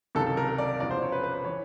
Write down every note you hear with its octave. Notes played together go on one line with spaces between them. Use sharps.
C#2 C3 D#3 F#3 A4
A4
A#4
A#4
D5
E1 E2 C#3 F3 D5
C5
C#5
B4
B4
B4
E3 C#5